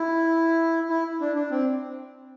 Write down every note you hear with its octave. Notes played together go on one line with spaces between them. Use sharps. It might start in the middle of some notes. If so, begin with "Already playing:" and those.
Already playing: E4
E4
D4
D4
C4